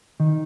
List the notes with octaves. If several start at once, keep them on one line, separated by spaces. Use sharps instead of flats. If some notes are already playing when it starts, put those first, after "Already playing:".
D#3 D#4